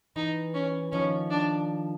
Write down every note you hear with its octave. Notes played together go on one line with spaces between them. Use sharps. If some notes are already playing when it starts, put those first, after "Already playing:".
E3 D#4
C#4
D#3 F3 C#4
D4